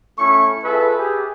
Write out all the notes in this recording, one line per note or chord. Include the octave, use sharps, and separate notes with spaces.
A3 C#4 E4 C#6
F4 G#4 A4 B4 E5
G4 G#4